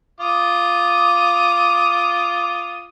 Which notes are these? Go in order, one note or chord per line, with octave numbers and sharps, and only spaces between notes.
F4 D6 D#6